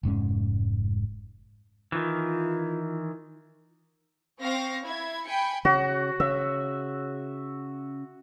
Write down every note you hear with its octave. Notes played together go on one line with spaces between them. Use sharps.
F1 G#2 G#3 C#4
D#3 E3 F4
C4 F5 C#6 A#6
E4 G#6
G5 G#5 B5 C#7
C#3 F#4
C#3 E5